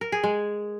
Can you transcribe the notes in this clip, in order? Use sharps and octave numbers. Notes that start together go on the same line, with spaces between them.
A#4
G#4
G#3